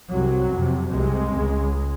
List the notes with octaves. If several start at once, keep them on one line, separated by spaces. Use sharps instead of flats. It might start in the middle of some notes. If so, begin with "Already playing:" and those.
C2 C3 F#3
F2 C3
C2 C3 G#3
C#2 C#3